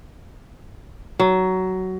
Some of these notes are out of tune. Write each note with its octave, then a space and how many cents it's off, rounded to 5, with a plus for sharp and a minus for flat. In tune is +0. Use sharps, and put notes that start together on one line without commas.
F#3 +15